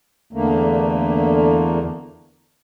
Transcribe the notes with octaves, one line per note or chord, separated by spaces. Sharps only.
E2 D3 A3 A#3